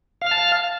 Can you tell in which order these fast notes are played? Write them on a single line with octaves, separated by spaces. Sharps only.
F5 F6 A5